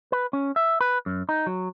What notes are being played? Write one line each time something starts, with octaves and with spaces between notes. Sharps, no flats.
B4
C#4
E5
B4
F#2
D#4
F#3